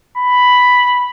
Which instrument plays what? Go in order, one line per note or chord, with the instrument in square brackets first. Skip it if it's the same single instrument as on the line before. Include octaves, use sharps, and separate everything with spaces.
[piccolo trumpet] B5